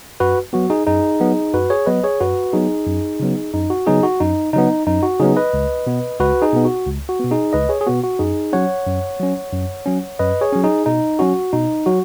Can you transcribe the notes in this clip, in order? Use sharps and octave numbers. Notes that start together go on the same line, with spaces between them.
F#2 F#4 B4
F#3 B3 F#4
D#4 G#4
F#2 D#4 G#4
F#3 B3
F#2 F#4 B4
G#4 C#5
F#3 B3 B4 D#5
G#4 C#5
F#2 F#4 B4
F#3 B3 D#4 G#4
F#2
C#3 F#3 B3
F#2 D#4
F#4
C#3 F#3 B3 D#4 G#4
F#4
F#2 D#4
C#3 F#3 B3 D#4
F#2 D#4
F#4
C#3 F#3 B3 D#4 G#4
B4 D#5
C#2
B2 B3
C#2 F#4 B4
D#4 G#4
B2 B3
F#4
C#2
F#4
B2 B3
D#4 G#4
C#2 B4 D#5
G#4 C#5
G#4
B2 B3 F#4
F#4
F#2 D#4 G#4
F#3 C#4 C#5 F#5
F#2
F#3 C#4
F#2
F#3 C#4
F#2 B4 D#5
G#4 C#5
F#3 C#4
D#4 G#4
B2 D#4
F#3 C#4 F#4
B2 D#4
F#3 F#4